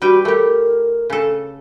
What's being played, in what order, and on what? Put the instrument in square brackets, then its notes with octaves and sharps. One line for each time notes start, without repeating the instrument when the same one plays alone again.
[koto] G3 B4 G5 [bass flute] F#4
[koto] A3 G4 [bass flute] A#4
[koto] C#3 A4